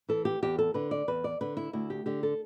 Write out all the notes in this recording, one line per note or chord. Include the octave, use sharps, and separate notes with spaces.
E3 A4
G4
E2 G4
A4
D3 B4
D5
E2 B4
D5
D3 B4
E4
D2 E4
G4
D3 G4
A4